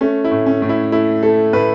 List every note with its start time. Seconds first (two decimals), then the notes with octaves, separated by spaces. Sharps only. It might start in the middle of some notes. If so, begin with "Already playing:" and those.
0.01 A3 C#4
0.24 E4
0.31 A2
0.46 C#4
0.62 A2
0.69 E4
0.92 A3 E4
1.23 A3 A4
1.53 A2 B4